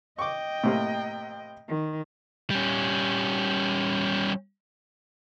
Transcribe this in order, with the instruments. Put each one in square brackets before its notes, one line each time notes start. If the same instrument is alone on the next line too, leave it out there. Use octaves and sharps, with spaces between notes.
[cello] D#5 G5 [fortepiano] C#6 D6
[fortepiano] A2 C3 A#3
[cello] D#3
[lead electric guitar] G3 C#4